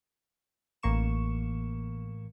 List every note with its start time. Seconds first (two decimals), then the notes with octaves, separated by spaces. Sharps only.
0.83 A1 A#3 C#6 E7